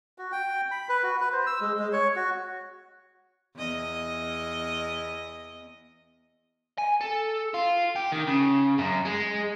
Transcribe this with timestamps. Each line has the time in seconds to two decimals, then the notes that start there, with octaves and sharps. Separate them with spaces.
0.18 F#4
0.32 G5
0.71 B5
0.89 B4
1.04 F#4
1.21 B4
1.32 C5
1.46 E6
1.61 G#3
1.79 G#3
1.93 C#5
2.16 F#4
3.55 E2 D#5
6.78 G#5
7.01 A4
7.54 F4
7.96 G4
8.12 D#3
8.27 C#3
8.78 F#2
9.05 G#3